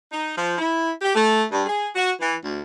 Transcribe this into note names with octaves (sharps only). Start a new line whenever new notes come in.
D#4
F3
E4
G4
A3
G2
G#4
F#4
E3
D2